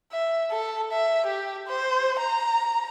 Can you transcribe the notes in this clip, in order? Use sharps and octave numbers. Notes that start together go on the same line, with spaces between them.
E5
A4
E5
G4
C5
A#5